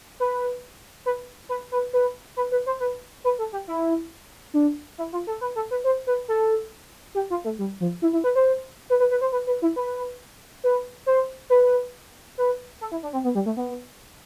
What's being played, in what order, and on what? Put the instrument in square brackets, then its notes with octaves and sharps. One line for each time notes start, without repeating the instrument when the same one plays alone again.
[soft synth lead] B4
B4
B4
B4
B4
B4
B4
C5
B4
B4
A4
G4
E4
D4
E4
F4
A4
B4
A4
B4
C5
B4
A4
G4
F4
A3
G3
F3
E4
E4
B4
C5
B4
B4
B4
C5
B4
B4
E4
B4
B4
C5
B4
B4
A4
E4
D4
C4
B3
G3
A3
B3